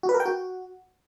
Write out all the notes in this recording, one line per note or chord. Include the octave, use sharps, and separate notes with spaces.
F#4
B4
A#4
G5
F#4